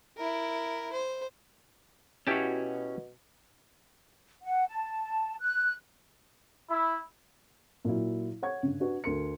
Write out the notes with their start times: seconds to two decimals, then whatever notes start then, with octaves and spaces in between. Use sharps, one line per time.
0.17 E4 A#4
0.92 C5
2.27 B2 C#4 E4 F#4 G4 A5
4.43 F#5
4.68 A5
5.40 F#6
6.69 E4
7.85 A#2 F#3 E4
8.42 C#5 F#5 C#6 G#6
8.63 G2 C#3
8.80 D4 F#4 B4
9.04 D2 A#4 C6 C#7